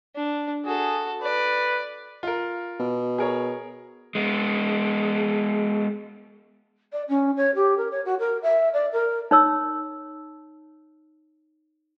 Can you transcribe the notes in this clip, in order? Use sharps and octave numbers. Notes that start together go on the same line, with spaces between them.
D4
F#4 G#4 A4
B4 D5
F4 A#4
B2
G#4 A#4 C#5
G#3 B3
D5
C#4
C#5
G4
A#4
C#5
F#4
A#4
E5
D5
A#4
D#4 C#5 E6